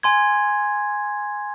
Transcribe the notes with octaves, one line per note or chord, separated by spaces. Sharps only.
G#5 C6 G#6